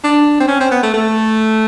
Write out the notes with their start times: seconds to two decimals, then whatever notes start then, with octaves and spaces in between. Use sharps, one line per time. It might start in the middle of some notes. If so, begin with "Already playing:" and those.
0.04 D4
0.40 C4
0.48 C#4
0.60 C4
0.71 B3
0.83 A3
0.94 A3